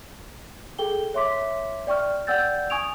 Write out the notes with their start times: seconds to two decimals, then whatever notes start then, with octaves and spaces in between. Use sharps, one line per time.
0.79 G#4 A4 G5 G7
1.14 C#5 E5 C6 D6 B6
1.87 D5 G5 C#6 F6
2.27 D5 F#5 G5 E6 G6 A6
2.70 G#5 C#6 D#6 G#6 D7 F7